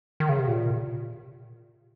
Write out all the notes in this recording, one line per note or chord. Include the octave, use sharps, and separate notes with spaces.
D#3
C#3
C3
A#2